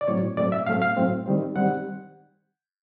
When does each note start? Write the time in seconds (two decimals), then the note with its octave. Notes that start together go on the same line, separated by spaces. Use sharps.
0.01 D5
0.08 A2 F#3 A3 C4 C#5
0.37 A2 F#3 A3 C4 D5
0.52 E5
0.67 A2 F#3 A3 C4 F5
0.82 F5
0.96 A2 F#3 A3 C4
1.26 D#3 G3 C4
1.55 D#3 G3 C4 F#5